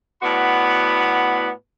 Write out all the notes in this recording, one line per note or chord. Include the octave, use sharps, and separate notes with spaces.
A2 B3 F#4 D5 B5